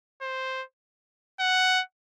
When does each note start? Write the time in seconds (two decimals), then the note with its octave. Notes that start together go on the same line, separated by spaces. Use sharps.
0.22 C5
1.40 F#5